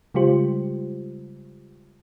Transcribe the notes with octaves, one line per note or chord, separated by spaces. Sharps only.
C#3 G3 G#3 F4 G4 C5